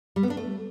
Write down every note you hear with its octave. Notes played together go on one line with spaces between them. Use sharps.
G3
B3
D4
A3